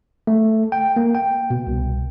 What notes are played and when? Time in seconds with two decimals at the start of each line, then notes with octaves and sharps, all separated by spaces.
0.27 A3
0.72 G5
0.96 A#3
1.15 G5
1.50 B2
1.67 C2